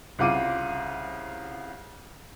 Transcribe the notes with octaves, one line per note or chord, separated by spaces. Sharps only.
C2 C#3 F4 F#5 D6 D#7